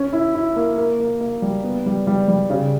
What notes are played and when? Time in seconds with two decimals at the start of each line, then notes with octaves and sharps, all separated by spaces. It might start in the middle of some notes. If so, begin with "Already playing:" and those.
Already playing: C#4
0.13 E4
0.35 E4
0.56 A#3
0.78 A#3
1.00 A#3
1.20 A#3
1.42 G3
1.64 B3
1.86 G3
2.07 G3
2.28 G3
2.50 C#3